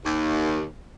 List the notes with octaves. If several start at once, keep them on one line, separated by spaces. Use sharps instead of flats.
D#2